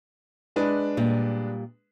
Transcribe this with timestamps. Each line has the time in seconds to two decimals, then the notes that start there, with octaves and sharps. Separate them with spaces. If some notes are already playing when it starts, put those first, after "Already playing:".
0.56 G#3 D4 B4
0.97 A#2 G3